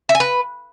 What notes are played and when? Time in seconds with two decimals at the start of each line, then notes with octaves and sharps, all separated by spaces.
0.09 E5
0.15 G#5
0.20 B4